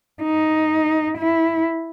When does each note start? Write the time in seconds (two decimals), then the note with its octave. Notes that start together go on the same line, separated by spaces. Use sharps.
0.22 D#4
1.18 E4